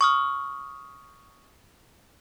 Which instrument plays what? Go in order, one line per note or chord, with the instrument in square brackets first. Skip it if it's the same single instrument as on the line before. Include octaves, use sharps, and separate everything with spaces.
[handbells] C#6 D#6 F6